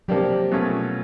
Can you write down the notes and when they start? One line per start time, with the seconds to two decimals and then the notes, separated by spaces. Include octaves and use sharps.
0.08 C3 F3 F#3 A#3 D4 G4
0.51 B2 F#3 A3 C#4 F4